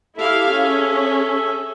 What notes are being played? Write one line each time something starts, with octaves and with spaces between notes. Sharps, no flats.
E4 G4 A4 E5 F5
C#4 G#4